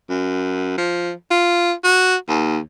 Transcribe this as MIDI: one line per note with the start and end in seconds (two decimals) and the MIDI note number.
0.10 0.75 42
0.78 1.12 53
1.31 1.72 65
1.84 2.15 66
2.29 2.59 39